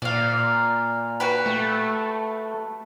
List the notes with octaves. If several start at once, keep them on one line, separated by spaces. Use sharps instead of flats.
A#2 D5 F5
F#4 G4 B4
A3